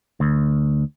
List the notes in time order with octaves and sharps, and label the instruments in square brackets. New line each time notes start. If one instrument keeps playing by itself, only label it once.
[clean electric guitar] D2